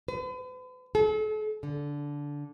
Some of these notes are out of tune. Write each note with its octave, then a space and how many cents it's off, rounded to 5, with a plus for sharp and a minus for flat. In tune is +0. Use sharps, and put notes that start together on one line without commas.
B4 +45
A4 -40
D3 -15